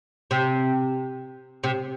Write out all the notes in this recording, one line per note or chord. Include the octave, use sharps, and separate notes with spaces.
C3
C3